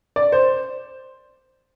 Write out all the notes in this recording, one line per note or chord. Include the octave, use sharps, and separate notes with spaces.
D5
C5